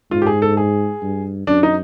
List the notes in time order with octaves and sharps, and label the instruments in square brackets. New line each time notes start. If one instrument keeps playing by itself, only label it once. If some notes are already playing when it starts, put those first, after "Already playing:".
[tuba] G#2 [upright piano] F4
[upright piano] G4
G#4
A4
G#4
[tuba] G2
[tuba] F#2 [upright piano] D4
[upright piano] D#4